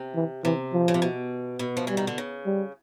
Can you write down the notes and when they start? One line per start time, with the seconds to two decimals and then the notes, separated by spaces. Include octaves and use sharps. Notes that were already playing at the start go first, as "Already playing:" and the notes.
Already playing: C3
0.15 E3
0.44 C3 E3
0.73 F3
0.88 C#3
0.94 C3
1.02 B2
1.59 B2
1.77 F3
1.87 E3 G3
1.97 D#3
2.07 D3
2.18 C#3
2.46 G3